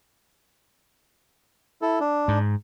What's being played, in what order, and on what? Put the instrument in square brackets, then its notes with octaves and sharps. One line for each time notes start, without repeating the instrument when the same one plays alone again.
[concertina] E4 A4
D4
[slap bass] G#2